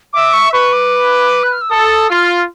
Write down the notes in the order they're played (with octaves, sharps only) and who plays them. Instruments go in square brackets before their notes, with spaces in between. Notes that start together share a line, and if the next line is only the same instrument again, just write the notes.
[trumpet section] E5 [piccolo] D6
[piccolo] C#6
[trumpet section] B4 [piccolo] C#6
[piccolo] D6
F#6
F6
E6
[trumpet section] A4 [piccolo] D#6
[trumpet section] F4 [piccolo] F6